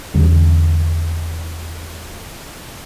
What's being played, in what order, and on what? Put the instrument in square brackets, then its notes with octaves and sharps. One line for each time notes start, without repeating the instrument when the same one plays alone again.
[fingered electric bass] E2 D3 G3 C#4